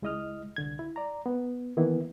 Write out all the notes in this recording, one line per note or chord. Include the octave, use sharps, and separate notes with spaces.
C#2 G#3 E4 D#5 D#6 F6
C2 D3 G#6
E4
D5 A#5
B3
D#3 E3 A#3 B3 E4